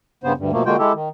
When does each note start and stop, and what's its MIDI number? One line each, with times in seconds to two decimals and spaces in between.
0.24 0.33 43
0.24 0.33 49
0.24 0.33 59
0.24 0.33 72
0.37 0.51 38
0.37 0.51 43
0.52 0.63 47
0.52 0.63 53
0.52 0.63 57
0.52 0.63 58
0.65 0.76 50
0.65 0.76 56
0.65 0.76 58
0.65 0.76 65
0.65 0.76 66
0.65 0.76 79
0.79 0.92 56
0.79 0.92 64
0.79 0.92 67
0.79 0.92 69
0.93 1.09 51